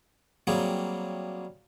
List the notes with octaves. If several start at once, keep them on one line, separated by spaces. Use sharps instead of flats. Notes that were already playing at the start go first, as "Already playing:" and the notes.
F#3 G3 A#3 C4 G#4